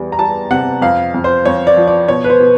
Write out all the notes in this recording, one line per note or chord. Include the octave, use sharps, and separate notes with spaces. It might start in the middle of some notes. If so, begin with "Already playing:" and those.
Already playing: E2 G3
A#5
G3 A5
C3 F#5
F2 F5
F2
C5
F2 C#5
D5
F3
D5
B2 C#5
B4
C5
B2